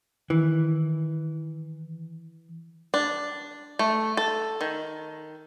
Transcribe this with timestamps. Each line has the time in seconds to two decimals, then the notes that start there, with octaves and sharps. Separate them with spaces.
0.30 D#3 E3
2.94 D4
3.79 A3
4.17 A4
4.61 D#3